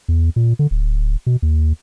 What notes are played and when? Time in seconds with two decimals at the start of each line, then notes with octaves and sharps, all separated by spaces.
0.08 E2
0.36 A#2
0.59 D3
0.71 D1
1.26 B2
1.42 D#2